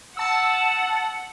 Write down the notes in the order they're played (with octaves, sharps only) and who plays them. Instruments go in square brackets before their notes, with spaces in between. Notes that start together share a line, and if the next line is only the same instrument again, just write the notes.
[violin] F#5 [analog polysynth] A5 E6